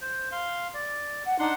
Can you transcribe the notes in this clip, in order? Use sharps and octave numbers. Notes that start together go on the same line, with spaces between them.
C5
F5 C6
D5
F#5
D4 D#4 F#5 C6